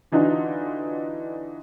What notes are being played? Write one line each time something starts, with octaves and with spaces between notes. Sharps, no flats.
D3 E3 D4 D#4 F4 F#4